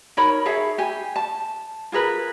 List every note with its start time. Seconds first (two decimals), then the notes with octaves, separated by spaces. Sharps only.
0.17 D#4 A#4 C#5 B5
0.45 G#4 A4 C#5 E5
0.78 G4 G#5
1.16 A5
1.92 F4 G#4 A#4 B4